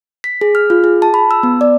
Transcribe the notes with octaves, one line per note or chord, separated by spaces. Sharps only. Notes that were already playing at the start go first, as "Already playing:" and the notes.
B6
G#4
F6
F4
G#4
A5
B5
E6
B3
D5